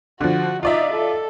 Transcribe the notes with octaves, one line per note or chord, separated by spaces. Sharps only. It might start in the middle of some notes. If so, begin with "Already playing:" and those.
D3 F3 F#4
D#4 F4 D5 E5
A4